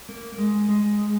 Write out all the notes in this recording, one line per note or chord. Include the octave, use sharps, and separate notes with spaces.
A#3
A#3
G#3
G#3